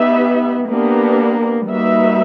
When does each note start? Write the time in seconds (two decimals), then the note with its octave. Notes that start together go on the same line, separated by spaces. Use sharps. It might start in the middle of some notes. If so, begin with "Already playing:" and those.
Already playing: B3 D#4 G4 B4 E5
0.69 A#3 B3 D4 G4 A#4
1.68 G3 A#3 D#4 F#4 B4 E5